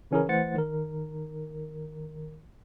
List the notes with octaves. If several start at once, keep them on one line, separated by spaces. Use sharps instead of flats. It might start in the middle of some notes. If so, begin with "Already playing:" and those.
C#3 E3 C#4 E4 G#4 A#4
E3 A3 C5 F#5 A6 C#7
D#3 A#4